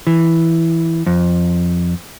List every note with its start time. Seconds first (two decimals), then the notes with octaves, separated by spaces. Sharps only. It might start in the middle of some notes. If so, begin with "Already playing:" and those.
0.07 E3
1.06 F2